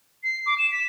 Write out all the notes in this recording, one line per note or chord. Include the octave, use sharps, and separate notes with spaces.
C7
D6
E7
B6